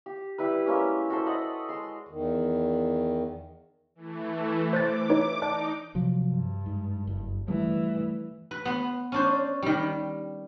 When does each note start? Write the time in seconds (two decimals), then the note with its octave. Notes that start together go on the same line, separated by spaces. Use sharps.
0.06 G4
0.38 G3 E4 G4 B4
0.66 G#3 A#3 C#4 G4
1.10 F#4 A4 C5
1.26 D5 D#5 F#5 B5
1.69 G#3 C6
2.07 E2 D#3
3.95 E3 A3
4.73 C5 D6 F#6 A6
5.10 D#4 B4 C#5
5.42 D#4 D5 A5 F#6
5.95 C3 F3 F#3
6.27 G2
6.66 G#2
7.07 F#1
7.48 E3 G3 A3
8.51 B4
8.65 B3 C6
9.12 C#4 D4 C5
9.63 D#3 G3